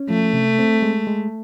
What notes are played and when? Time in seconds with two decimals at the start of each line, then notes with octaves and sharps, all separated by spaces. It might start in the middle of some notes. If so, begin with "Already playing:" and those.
Already playing: C#4
0.09 F3 A3
0.33 C3
0.59 C4
0.82 G#3
1.07 G#3